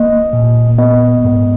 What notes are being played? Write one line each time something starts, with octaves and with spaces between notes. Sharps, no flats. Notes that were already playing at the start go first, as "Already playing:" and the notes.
Already playing: A#3 D#5
A#2
B3 D#5
G#2